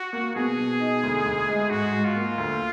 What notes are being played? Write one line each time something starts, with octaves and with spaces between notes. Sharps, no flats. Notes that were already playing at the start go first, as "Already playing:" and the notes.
Already playing: F#4
A#3
B2 G#4
B2
D#4
D2
D2
G#3
G#2 F#4
G#2
F4
A#3
D2